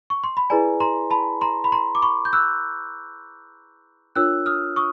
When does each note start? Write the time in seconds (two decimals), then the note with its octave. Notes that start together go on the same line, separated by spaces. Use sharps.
0.10 C#6
0.24 C6
0.37 B5
0.50 E4 G#4 B4 D5 G#5 A#5
0.80 A#5 C6
1.10 A5 B5
1.41 A#5 C6
1.64 B5
1.72 A#5 C6
1.95 D6
2.02 B5 C#6
2.25 G6
2.33 E6 F#6
4.15 D4 F4 A#4 C#5 E6 F#6
4.46 D#6 F6
4.76 C#6 D#6